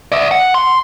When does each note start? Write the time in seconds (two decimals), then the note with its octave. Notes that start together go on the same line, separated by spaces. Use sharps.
0.12 D5 E5
0.31 F#5
0.54 C6